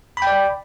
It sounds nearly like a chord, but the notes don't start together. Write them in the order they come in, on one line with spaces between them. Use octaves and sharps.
B5 G5 D5